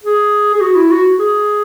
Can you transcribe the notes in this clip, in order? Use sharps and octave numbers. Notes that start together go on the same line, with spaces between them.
G#4
G#4
F#4
E4
F#4
G#4